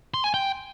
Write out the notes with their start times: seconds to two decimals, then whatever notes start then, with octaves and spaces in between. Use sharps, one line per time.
0.14 C6
0.24 G#5
0.34 G5